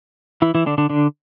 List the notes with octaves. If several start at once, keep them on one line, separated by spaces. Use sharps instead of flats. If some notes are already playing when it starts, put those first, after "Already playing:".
E3 E4
E3 E4
D3 D4
D3 D4
D3 D4